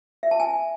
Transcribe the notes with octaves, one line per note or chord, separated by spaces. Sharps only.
E5
A5
G#5